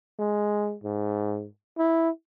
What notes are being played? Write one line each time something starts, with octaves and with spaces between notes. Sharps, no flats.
G#3
G#2
E4